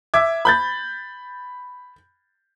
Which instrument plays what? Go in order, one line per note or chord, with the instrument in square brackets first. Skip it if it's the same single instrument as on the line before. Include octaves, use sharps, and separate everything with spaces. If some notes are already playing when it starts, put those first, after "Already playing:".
[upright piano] E5 D6 G#6
B5 G6 A6